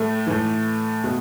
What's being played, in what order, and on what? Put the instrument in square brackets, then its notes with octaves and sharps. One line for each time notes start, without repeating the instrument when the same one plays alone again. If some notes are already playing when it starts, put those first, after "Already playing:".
Already playing: [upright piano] A2 A3
A2 E3
B2